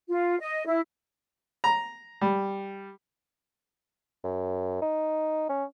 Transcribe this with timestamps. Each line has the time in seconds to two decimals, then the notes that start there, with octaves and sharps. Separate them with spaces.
0.09 F4
0.40 D#5
0.66 E4
1.64 A#5
2.21 G3
4.24 F#2
4.82 D#4
5.49 C#4